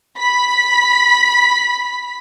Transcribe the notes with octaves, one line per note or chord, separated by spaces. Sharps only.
B5 B6